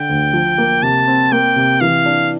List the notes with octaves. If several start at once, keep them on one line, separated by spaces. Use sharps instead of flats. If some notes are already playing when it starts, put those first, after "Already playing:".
Already playing: D3 G5
D2
F3
A#3
C3 A5
C4
A#3 G5
C3
E3 F5
D4